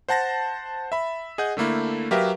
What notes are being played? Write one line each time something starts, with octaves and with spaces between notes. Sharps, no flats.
C5 F#5 A5 A6 A#6
E5 B5
G#4 D#5 F#5 G6
D3 A3 A#3 E4
F#3 G4 A#4 B4 E5 F5